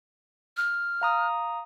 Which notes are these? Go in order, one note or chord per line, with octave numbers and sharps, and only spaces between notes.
F6
F5 A#5 D#6